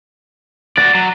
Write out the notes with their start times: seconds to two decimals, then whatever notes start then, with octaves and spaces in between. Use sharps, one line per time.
0.77 F#4 D5 F#6 A6 A#6
0.95 F#3